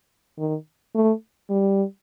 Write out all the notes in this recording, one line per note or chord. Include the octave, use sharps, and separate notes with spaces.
D#3
A3
G3